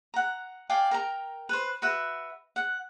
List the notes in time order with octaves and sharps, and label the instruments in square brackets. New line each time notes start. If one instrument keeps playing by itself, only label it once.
[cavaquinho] F#5 A#5
D5 F5 G5 G#5
A#4 G5 A#5
B4 C5
F#4 B4 E5
F#5